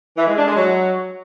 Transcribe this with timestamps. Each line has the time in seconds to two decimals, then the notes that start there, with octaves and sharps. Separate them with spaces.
0.17 E3
0.26 G#3
0.36 D4
0.46 G#3
0.56 F#3